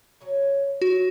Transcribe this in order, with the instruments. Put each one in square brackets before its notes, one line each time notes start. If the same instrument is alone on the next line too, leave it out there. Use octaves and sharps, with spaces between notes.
[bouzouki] C#3 F#3 C#4
[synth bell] F#4 [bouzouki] G4